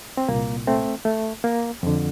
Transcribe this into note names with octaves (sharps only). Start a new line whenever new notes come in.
C4
C2 A#2 A#3
A3 C4
A3
A#3
F2 D3